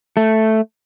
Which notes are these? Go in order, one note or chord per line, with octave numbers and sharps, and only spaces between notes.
A3